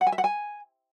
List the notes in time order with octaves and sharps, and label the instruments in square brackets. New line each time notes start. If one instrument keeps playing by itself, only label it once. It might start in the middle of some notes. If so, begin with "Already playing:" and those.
[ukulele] F#5
G#5
E5
F#5
G#5